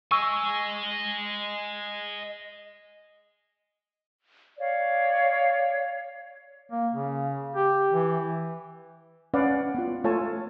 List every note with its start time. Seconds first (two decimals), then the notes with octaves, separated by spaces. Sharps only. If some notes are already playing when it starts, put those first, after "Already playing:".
0.11 D#5 G#5 C#6 E6
4.58 C#5 D5 F5
6.71 A#3
6.93 C#3
7.55 G4
7.92 E3
9.34 C#4 B4 D5 F5 F#5
9.75 B3 F4
10.04 A3 F4 A4 C#5 G#5 A5